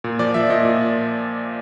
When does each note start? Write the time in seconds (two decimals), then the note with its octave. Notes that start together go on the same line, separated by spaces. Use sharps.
0.04 A#2
0.19 F3 D5
0.34 F3 E5
0.50 A#2 D#5
0.65 A#2